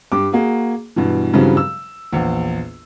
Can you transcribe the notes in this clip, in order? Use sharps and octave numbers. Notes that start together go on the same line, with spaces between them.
G2 G4 D6
A#3 F#4 G#4
G2 B2 E3
G2 C#3 E3 F#3 G3 C4
E6
A#1 E2